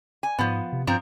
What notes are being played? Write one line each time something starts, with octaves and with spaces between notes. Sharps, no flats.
G#5
G#2 F3 B3
C3
G2 F3 C4 A#5